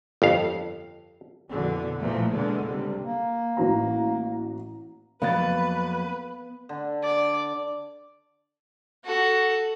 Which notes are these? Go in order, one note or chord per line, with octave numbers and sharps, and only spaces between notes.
G1 F2 F5
F2 B2 D3 E3
A#2 E3 F3 A3 A#3
E2 B2 D3 G#3
C#2 C3 G3
A#3
A1 F#4 A#5
F2 F#3 A#3 B3 B4 F5 B5 A6
D3
D5
F#4 A4